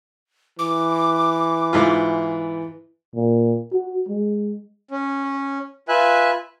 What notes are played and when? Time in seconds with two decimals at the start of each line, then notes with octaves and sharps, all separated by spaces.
0.59 E3 D6
1.73 G#2 E4 F4
3.15 A#2
3.73 F#4
4.08 G#3
4.91 C#4
5.88 F4 B4 E5 G#5 F#6